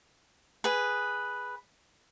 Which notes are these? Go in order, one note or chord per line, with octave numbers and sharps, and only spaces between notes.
G#4 B4